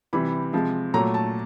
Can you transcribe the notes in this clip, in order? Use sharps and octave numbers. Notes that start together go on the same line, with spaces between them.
C3 E3 G3 B5
C3 F3 G#3
A#2 F#3 A3 A#5
A5